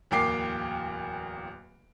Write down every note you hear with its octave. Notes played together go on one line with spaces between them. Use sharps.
D1 E2 A#3 G5 D6 C7